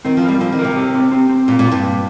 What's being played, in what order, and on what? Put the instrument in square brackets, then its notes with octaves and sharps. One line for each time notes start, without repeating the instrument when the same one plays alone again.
[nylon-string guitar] D#3 [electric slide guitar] C4
[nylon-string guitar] F3
[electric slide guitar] A#4
[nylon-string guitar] G3
[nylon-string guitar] F3 [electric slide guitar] C4
[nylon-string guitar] D#3
[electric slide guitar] A#4
[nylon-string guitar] C3
[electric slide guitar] G4
C4
C4
C4
[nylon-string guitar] A#2 [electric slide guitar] A#3
[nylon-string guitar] A#2
[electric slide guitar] F4
[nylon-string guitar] G2
[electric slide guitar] A#3